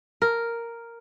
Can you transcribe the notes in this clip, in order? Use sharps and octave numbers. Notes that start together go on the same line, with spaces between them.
A#4